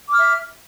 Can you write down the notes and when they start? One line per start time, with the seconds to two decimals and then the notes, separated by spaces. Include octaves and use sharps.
0.09 D6
0.12 F6
0.16 E5